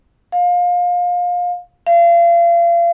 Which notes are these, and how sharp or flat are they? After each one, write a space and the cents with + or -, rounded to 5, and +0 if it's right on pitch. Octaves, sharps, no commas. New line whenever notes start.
F5 +25
F5 -35